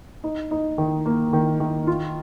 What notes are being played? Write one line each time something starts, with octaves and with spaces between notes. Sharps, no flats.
D#4
D#4
D#3
A#3
D#3
D#3
F4